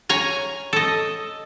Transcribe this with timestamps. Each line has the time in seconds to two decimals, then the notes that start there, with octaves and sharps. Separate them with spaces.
0.09 C#5 G#5 A#5
0.73 A4 D#5